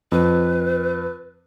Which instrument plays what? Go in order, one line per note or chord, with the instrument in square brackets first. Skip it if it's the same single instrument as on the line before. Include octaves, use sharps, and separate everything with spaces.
[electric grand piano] F2 [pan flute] B4